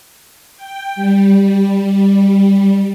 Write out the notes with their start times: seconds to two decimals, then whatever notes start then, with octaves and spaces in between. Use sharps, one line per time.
0.56 G5
0.96 G3